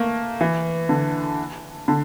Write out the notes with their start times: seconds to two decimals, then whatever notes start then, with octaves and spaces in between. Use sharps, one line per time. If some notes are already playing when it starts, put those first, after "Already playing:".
Already playing: A3 A#3
0.41 E3
0.89 D3
1.88 D3